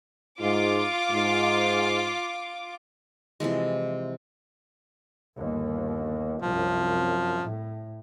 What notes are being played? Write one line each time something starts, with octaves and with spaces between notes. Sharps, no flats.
G#2 F4 D6
G#2
C3 E3 F3 G#3
G1 D#2
C2 F#2 F3
A2